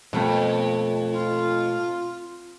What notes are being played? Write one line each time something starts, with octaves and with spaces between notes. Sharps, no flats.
F2 B2 A3 A#3
F4